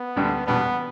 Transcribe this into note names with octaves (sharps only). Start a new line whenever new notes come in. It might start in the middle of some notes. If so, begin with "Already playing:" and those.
Already playing: B3
D2 D3 G3 D4
E2 B2 G3 B3 D4